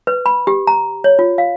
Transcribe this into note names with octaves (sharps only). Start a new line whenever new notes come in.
B4
B5
G4
A#5
C#5
F4
F5